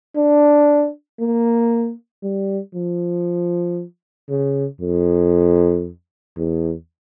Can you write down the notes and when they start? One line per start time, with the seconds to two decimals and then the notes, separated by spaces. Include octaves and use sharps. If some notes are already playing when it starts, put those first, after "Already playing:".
0.17 D4
1.20 A#3
2.23 G3
2.75 F3
4.30 C#3
4.81 F2
6.37 E2